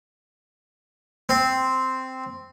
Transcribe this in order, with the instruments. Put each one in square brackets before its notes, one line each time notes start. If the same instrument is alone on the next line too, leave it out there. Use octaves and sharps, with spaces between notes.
[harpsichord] C4